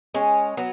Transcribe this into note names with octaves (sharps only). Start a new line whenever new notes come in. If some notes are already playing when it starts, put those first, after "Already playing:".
G#3 C#4
F#3 B3